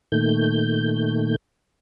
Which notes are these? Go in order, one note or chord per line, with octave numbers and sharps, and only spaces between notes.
A#2 D#3 A3 G6